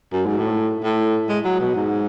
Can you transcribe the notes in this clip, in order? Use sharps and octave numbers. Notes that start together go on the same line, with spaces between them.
F#2
G#2
A2
A2
G#3
F#3
B2
G#2